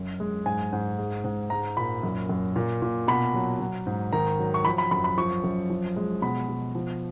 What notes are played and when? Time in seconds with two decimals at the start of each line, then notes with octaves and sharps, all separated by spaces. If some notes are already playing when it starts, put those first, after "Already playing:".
Already playing: F#2
0.20 G#3
0.46 G#2 G#5
0.73 G#2
0.98 G#3
1.24 G#2
1.50 G#3 A#5
1.77 A#2 B5
2.03 F#2
2.29 F#2
2.56 A#2
2.82 A#2
3.08 B2 B5
3.34 F#3
3.60 F#3
3.87 G#2
4.13 D#3 A#5
4.39 F#3
4.54 C#6
4.65 F3 B5
4.78 B5
4.91 F#2 B5
5.04 B5
5.18 F3 C#6
5.44 F#2
5.70 F3
5.96 G#3
6.22 B2 B5
6.49 B2
6.75 F3